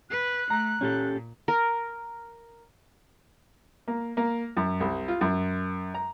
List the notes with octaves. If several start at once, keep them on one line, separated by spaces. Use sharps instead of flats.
B4 F#6
A3 A#5
A#2 C#4 G4 A4
A#4
A#3
A#3
F#2
C2
F4
F#2
A#5